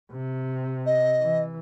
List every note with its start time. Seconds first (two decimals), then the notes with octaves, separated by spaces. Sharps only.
0.12 C3
0.86 D#5
1.20 E3